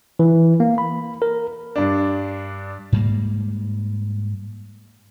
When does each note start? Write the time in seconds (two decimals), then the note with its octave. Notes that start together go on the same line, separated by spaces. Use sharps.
0.19 E3
0.60 A#3
0.78 B5
1.22 A#4
1.76 G2 D4
2.92 G#2 G3 A#3